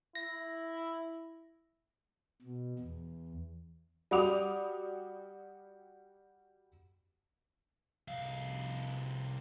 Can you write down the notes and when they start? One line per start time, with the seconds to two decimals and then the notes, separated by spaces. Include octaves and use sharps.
0.15 E4 A#6
2.41 B2
2.79 E2
4.11 G3 F#4 D6 D#6 F7
8.08 C2 F5